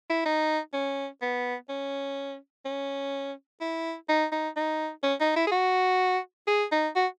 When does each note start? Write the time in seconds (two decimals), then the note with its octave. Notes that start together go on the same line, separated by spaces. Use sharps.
0.10 E4
0.26 D#4
0.74 C#4
1.22 B3
1.69 C#4
2.66 C#4
3.61 E4
4.09 D#4
4.32 D#4
4.57 D#4
5.04 C#4
5.21 D#4
5.37 E4
5.47 G#4
5.52 F#4
6.48 G#4
6.72 D#4
6.96 F#4